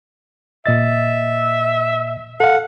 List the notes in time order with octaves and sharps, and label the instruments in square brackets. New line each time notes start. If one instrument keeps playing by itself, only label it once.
[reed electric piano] A#2 D#5 A6 [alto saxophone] E5
[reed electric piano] A4 F5 [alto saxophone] F#5